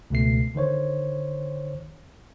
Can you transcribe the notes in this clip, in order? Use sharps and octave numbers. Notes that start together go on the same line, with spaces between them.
C#2 B2 A3 C7
D3 D#3 C5 C#5